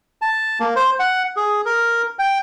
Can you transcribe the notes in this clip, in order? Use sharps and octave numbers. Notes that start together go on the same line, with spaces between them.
A5
A#3
C5
F#5
G#4
A#4
G5